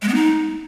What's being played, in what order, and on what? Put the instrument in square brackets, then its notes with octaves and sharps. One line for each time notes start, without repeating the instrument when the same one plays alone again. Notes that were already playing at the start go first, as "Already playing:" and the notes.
[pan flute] G#3
B3
D#4